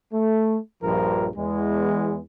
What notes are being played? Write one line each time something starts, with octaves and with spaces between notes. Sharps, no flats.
A3
A#1 G2 F3 A#4
E2 G#3